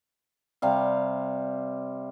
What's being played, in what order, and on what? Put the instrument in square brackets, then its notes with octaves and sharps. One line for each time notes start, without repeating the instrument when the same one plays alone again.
[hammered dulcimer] C3 G3 F5